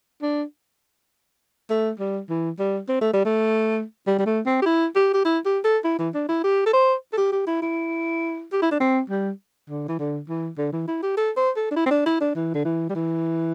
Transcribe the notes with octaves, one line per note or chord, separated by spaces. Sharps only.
D4
A3
G3
E3
G3
C4
A3
G3
A3
G3
G3
A3
C4
G4
E4
G4
G4
E4
G4
A4
E4
E3
D4
E4
G4
A4
C5
A4
G4
G4
E4
E4
G4
E4
D4
C4
G3
D3
E3
D3
E3
D3
E3
E4
G4
A4
C5
A4
D4
E4
C4
D4
E4
D4
E3
D3
E3
G3
E3